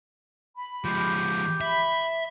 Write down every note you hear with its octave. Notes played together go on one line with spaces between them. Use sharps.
B5
F3 G#3 G4
E5 B5